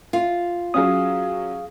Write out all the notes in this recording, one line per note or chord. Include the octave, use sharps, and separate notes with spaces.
F4
F#3 C#4 G#4 F5 D#6